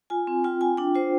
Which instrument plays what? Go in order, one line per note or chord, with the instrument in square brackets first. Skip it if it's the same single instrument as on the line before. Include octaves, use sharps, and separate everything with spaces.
[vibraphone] F4 G#5
C4
F4 G5
F4 G#5
D4 G5
F4 C5